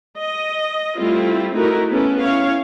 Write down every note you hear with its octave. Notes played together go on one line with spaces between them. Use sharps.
D#5
G3 A3 C4 E4 F4
A3 D#4 E4 F#4 A#4
B3 C#4 E4 A4
C#4 E4 C#5 F5